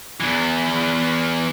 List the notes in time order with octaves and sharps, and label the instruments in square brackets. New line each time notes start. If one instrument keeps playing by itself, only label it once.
[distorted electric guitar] E2 E3